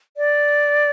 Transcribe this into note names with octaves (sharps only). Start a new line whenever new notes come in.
D5